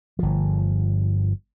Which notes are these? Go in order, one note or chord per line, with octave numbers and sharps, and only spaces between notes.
G1 F3